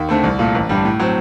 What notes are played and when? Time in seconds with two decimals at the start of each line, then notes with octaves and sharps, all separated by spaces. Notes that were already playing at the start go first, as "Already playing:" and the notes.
Already playing: D#2
0.09 D3 A3 C4
0.24 C2
0.39 A#2 A3
0.55 A1
0.69 G2 D3 G3
0.85 A2
1.00 F#3 C4